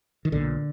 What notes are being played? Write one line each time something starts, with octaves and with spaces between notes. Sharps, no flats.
D#3
B1 A#2 D3